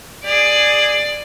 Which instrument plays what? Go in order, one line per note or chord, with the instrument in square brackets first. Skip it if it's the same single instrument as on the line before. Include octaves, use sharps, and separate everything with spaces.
[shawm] G#4 [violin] D5